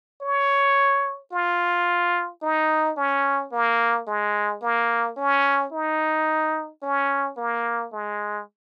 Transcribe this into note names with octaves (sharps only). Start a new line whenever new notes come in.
C#5
F4
D#4
C#4
A#3
G#3
A#3
C#4
D#4
C#4
A#3
G#3